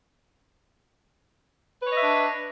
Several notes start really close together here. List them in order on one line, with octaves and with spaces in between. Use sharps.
B4 C#5 D#5 E5 D4